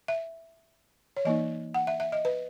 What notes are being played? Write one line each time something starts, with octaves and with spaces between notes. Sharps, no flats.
E5
C#5
E3 A#3 D#4 D#5
F#5
E5
E5
D#5
B4